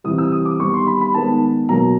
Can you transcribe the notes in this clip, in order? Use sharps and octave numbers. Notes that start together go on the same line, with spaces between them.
C3 E3 G3 D#6
E6
D#6
D6
D#3 G3 B3 C#6
C6
B5
B5
D#3 G#3 B3 A5
B2 F#3 A#3 A#5